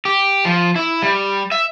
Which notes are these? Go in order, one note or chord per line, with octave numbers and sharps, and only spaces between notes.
G4
F3
E4
G3
E5